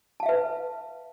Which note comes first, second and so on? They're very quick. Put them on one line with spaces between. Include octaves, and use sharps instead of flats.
A5 F5 E5 B4